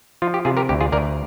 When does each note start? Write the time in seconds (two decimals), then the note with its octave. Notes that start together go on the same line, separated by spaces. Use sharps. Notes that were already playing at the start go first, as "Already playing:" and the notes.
0.22 F3 F4
0.34 G4
0.45 C3 F4 G#4
0.57 G4 A#4
0.69 D2 G4
0.81 F4 G#4
0.92 D2 A#4 D5